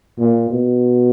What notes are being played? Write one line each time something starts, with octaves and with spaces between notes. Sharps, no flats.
A#2
B2